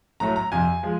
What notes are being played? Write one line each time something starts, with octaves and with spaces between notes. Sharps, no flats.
A2 F#3 A3 A#5
A#5
F2 C3 F3 G#5
F3 G#3